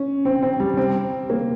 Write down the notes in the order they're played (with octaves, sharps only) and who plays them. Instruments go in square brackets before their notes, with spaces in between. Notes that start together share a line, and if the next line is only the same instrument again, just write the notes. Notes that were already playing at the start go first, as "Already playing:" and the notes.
Already playing: [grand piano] C#4
C4
C4
G3
C4
A#3